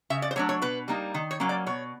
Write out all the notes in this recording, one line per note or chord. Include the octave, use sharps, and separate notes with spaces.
C#3 E5
D5
C5
F#3 A3 D4 C#5
C#5
B2 B4
G3 A#3 D#4
D#3
C#5
F#3 A#3 C#4
D5
B2 C#5